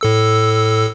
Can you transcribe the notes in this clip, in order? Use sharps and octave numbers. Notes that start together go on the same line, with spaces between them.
A2 A4 E6